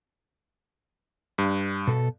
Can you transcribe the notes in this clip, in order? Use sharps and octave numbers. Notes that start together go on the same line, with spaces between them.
G2
B2 A4